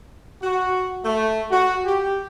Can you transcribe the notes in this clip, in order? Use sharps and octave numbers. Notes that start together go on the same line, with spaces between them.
F#4
A3
F#4
G4